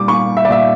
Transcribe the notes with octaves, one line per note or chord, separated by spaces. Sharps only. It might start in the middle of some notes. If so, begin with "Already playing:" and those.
Already playing: A#2 G3 D6
A#3 C#6
E5
D5
A#2 E5